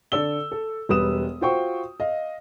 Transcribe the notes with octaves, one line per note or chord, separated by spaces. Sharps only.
D3 A4 D5 E6 G7
A4
E1 G3 B4 D#6 E7
F4 F#4 C5 G5 C#6
D#5 F5